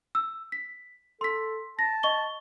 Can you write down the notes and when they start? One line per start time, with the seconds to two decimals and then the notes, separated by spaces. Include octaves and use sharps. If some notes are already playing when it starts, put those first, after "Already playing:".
0.15 E6
0.52 B6
1.21 A4 C6 B6
1.79 A5 A#6
2.03 D#5 C#6 G7